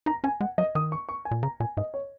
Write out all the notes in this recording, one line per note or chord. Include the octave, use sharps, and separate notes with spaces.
D#4 A#5
C#4 G#5
G#3 F#5
F#3 D#5
D#3 D#6
C#6
C#6
G#5
A#2
C#3 A#5
A#2 G#5
G#2 D#5
C#5